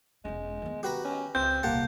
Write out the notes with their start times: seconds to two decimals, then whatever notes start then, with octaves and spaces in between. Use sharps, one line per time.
0.25 E1 G#3 C#4
0.62 D#3 B3
0.83 F#4 G4 B4 A#5
1.05 C#4
1.35 C#2 C4 G6
1.63 D#1 C2 A#3 G4 F#5 A5